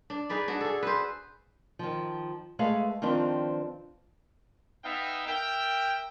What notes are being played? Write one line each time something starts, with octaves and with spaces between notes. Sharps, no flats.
D4
D#4 G#4 B4 D5
D4 F#4
G#4 A4
B4 C5
D#3 F3
G#3 A3 G#4 B4 F5
D#3 F3 C4 D4 B4
B3 D#4 E5 F5 G5
A#4 E5 G5